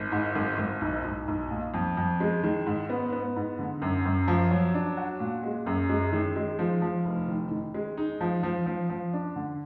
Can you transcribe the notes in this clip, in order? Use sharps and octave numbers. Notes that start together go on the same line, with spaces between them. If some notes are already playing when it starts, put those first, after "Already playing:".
Already playing: G#1
G#2
G#1
G#1
B1
B1
B1
A#2
F2
F2
G#3
D#3
G#2
B3
B3
G#2
D3
F#2
F#2
F3
F#3
D4
F#4
A#2
G#3
F#2
G#3
D#3
G#3
F3
F3
F1
D#3
D#3
G#3
D#4
F3
F3
F3
F3
D4
D3